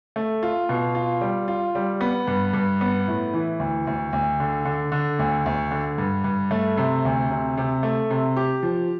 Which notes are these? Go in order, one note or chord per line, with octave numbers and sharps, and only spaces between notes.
A3
F4
B2
F4
G3
F4
G3
B3
G2
G2
B3
A2
E3
D2
D2
D2
D3
D3
D3
D2
D2
D3
G2
G2
A3
C3
D2
C3
C3
A3
C3
G4
F3